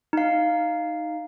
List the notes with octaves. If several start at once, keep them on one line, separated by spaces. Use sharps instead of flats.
D#4 F5